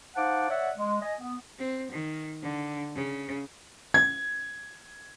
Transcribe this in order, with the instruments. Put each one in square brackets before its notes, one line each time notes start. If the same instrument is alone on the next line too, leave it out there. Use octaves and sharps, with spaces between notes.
[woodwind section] D#4 C5 F5 F#5 A5 D6
C#5 D5 E5 F#5
G#3
D#5 G#5
B3
[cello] C4
D#3
D3
C#3
[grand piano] G#6